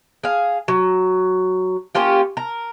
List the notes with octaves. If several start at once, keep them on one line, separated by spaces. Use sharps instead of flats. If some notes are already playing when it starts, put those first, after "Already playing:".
G#4 F5
F#3
A#3 C#4 F4 G4
A#4